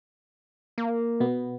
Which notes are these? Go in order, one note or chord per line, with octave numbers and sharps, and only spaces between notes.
A#3
B2 B3